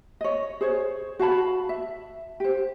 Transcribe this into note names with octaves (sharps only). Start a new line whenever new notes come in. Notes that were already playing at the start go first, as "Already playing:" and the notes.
C#5 D#5
G#4 C5 C#5
F#4 F5 A5 B5
E5
G4 C5